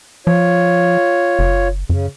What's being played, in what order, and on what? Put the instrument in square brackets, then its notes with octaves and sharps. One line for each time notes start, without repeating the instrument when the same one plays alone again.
[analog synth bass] F3 [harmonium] F4 C#5
[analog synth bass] F#1
[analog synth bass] F#2 [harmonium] C#3